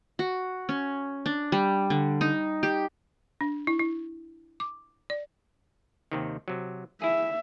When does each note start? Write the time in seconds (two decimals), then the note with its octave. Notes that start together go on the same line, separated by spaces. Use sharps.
0.19 F#4
0.69 C#4
1.26 D4
1.52 G3
1.90 D3
2.21 D#4
2.63 G4
3.41 D4
3.67 E4
3.79 E4
4.60 D6
5.10 D5
6.12 D#2 C3 D#3
6.48 C3 F#3
7.02 E4 G#4 E5